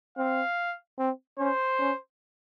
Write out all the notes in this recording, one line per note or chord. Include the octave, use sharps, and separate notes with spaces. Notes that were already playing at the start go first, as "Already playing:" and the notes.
C4 F5
C4
C#4 C5
C#4